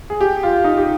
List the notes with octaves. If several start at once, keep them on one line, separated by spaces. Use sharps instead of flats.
G#4
G4
F4
D#4
G4